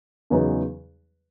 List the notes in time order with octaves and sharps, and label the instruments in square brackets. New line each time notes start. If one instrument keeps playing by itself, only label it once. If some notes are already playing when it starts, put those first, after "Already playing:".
[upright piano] E2 C#3 F#3 B3 D#4